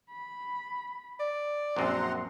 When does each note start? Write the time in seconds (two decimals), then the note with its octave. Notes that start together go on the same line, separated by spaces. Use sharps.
0.11 B5
1.20 D5
1.76 A#1 F#2 C4 F#5 A#5 C6